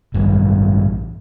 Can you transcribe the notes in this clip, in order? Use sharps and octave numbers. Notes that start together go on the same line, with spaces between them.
A1 G2